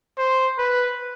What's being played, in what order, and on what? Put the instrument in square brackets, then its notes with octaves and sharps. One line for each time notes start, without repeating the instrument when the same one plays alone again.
[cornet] C5
B4